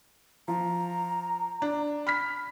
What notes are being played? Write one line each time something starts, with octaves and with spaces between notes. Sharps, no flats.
F3 A#5
D4
B5 F6 B6